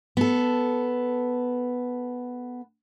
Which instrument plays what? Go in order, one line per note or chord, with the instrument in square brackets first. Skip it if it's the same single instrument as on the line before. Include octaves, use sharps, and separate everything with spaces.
[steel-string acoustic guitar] B3 A4